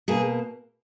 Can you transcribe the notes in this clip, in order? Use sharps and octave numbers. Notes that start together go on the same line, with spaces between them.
B2 A#3 G#4